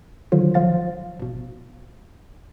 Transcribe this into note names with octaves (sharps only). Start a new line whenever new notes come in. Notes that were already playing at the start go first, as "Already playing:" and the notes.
D3 D#3 F#3 F4 C5
G#1 F3 C5 F5 A6
G#1 B2